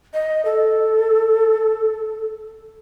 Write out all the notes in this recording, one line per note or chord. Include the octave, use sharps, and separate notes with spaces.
D#5
A4